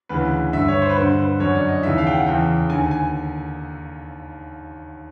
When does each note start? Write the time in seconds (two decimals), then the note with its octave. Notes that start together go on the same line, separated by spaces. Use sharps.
0.09 D2 C#3 E3 B4
0.53 G2 D3 E5
0.68 C#5
0.82 C5
0.89 B4
0.96 G2 D3 C5
1.18 B4
1.40 F#2 D3 C#5
1.55 D5
1.69 D#5
1.83 D#2 C#3 E3 E5
1.98 F5
2.07 G5
2.11 F#5
2.26 E2 C#3 E3 G5
2.69 D#2 D3 G#5
2.91 G#5